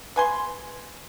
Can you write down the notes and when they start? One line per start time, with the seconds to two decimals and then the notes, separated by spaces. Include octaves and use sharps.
0.16 B4 G#5 C6